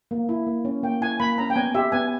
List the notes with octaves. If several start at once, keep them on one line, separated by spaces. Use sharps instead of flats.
A#3
E4
A#3
C#4
A#3 G5
E4 G#5
A#3 B5
C#4 A#5
G5
B3 G#5
G4 E5
B3 G#5